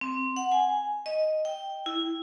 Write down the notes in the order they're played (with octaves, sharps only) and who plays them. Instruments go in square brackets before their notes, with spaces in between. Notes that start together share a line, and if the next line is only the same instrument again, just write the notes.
[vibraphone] C4
F#5
G#5
D#5
G5
E4